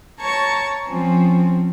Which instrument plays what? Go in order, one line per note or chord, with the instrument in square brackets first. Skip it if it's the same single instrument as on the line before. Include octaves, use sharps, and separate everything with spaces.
[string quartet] C#5 A5 A#5 C#6
F3 C4 C#4